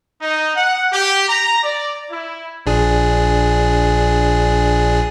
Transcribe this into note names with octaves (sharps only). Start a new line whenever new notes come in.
D#4
F#5
G4
A#5
D5
E4
A#1 D4 G#4